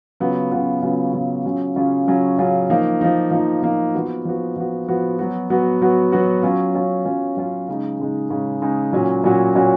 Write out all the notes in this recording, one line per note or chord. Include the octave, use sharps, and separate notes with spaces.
C#3 F#3 B3 F4
C#3 F#3 B3 F4
C#3 F#3 B3 F4
C#3 F#3 B3 F4
C#3 F#3 C#4 F4
C#3 F#3 C#4 F4
C#3 F#3 C#4 F4
C#3 F#3 C#4 F4
F3 A#3 D#4
F3 A#3 D#4
F3 A#3 D#4
F3 A#3 D#4
F3 B3 F#4
F3 B3 F#4
F3 B3 F#4
F3 B3 F#4
F#3 B3 F#4
F#3 B3 F#4
F#3 B3 F#4
F#3 B3 F#4
F#3 C#4 F4
F#3 C#4 F4
F#3 C#4 F4
F#3 C#4 F4
C#3 G#3 D#4
C#3 G#3 D#4
C#3 G#3 D#4
C#3 G#3 D#4
A#2 F#3 C#4 F#4
A#2 F#3 C#4 F#4
A#2 F#3 C#4 F#4